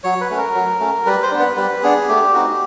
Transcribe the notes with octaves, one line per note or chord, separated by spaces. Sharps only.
F#3 C#5
B4
A3 C#4
A#4
F#3
A3 C#4
G3 B4
C5
B3 D4
B4
G3 B4
B3 D4 G#4
A3 G4
C4 D#4 F#4